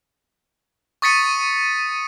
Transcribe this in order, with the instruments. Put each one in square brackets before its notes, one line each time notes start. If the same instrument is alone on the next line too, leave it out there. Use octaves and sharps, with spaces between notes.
[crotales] C#6 D#6 A6 B6 C#7 D#7